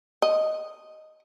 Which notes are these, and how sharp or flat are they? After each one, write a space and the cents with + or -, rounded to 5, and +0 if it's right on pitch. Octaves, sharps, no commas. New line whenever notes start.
D#5 +0